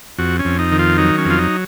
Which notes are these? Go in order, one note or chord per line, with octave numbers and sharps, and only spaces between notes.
F2 F#4
C#4
F2
D#4
D#3
F4
F#3 D#4
C#4
F2 F4
D#4